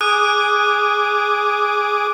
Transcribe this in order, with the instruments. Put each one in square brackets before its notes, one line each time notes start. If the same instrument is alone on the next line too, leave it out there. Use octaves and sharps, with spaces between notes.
[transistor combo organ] G#4 D6 [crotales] D#6 F#6 D#7